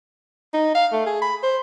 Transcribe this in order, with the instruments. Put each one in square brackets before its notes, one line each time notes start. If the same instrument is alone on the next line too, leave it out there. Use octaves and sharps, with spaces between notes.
[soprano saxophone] D#4
F5
A3
G#4
B5
C5